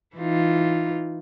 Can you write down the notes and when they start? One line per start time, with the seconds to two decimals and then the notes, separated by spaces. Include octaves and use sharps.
0.16 E3 D#4 F4